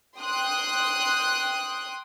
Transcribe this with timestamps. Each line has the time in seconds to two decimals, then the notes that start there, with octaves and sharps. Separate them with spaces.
0.17 G5 C6 D#6 F#6